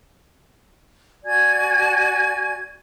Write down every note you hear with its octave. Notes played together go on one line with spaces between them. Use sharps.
F#4 D5 G#5 G#6